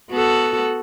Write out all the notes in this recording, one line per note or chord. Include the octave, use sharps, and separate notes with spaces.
B3 F#4 A4